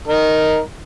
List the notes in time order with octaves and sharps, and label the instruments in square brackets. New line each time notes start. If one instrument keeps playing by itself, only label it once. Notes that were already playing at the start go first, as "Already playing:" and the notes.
[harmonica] D#4 A#4